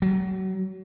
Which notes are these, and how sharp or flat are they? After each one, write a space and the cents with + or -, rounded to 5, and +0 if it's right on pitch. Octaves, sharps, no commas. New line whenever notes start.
F#3 +30